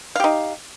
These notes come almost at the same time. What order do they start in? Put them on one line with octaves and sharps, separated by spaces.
F5 G4 D#4